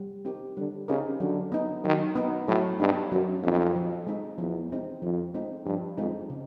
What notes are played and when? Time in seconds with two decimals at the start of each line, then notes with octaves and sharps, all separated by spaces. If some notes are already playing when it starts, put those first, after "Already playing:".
Already playing: G3
0.25 C4 D#4 G4 A#4
0.57 D3 G3
0.88 C#3 C4 D#4 G4 A#4
1.20 D3 F#3
1.52 B3 D#4
1.84 D#3 F#3
2.15 B3 D#4
2.48 A2 F#3
2.80 G2 B3 D#4
3.11 F#2 F#3
3.43 F2 B3 D#4
3.76 F3
4.07 G#3 C4 D#4
4.38 E2 F3
4.70 G#3 C4 D#4
5.02 F2 F3
5.34 G#3 C4 D#4
5.66 G2 F3
5.98 F2 G#3 C4 D#4
6.30 C#3